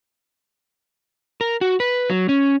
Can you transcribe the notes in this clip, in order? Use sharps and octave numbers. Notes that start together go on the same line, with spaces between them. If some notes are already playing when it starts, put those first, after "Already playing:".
A#4
F#4
B4
F#3
C#4